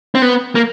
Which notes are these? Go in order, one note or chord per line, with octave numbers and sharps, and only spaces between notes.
C4
B3
A#3